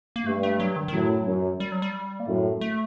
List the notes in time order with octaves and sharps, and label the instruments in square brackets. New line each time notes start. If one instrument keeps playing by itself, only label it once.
[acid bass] A#3
[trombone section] G2 [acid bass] A3
[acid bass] A3
F#3
D#3
D#3
[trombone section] F#2 A2 [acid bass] F#3
[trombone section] F#2
[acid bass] G3
F#3
G3
A#3
[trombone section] F#2 A2 [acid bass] A3
[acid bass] A3